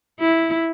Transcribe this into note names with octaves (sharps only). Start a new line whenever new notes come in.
E4